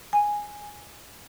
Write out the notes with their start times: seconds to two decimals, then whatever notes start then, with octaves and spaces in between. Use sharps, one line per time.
0.13 G#5